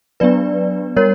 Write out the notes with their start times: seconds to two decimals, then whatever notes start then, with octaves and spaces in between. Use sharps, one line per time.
0.20 F#3 B3 D4 B4 D5
0.96 G3 A#4 C#5